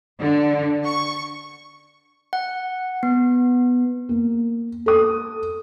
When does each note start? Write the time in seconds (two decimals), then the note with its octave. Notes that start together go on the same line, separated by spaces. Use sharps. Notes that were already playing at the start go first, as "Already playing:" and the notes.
0.20 D3
0.86 C#6
2.33 F#5
3.03 B3
4.09 A#3
4.86 A4 D#6